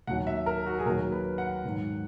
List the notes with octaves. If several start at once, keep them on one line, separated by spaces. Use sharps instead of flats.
D#2 D#3 F#3 F#5
E5
A#4
F#4
G#4
D#2 D#3 F#3 A#4
B4
F#5
G#2 D#3 F#3